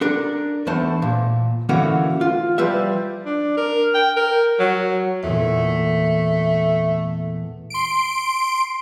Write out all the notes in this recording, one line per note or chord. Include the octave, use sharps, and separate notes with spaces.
D4 A4 A#4
E2 A3 C5 A5
A#2
D3 E3 A3 A#3 C#4 F#4
F4
F3 G3 B4 E5
D4
A#4
G5
A#4
F#3
E2 A#2 A3
C6 D7